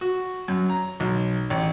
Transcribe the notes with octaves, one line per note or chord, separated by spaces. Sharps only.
F#4
F#2
A#5
B1
A1